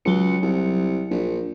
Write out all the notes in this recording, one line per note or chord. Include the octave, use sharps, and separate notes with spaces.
C#2 F#3 C#7
C2
A#1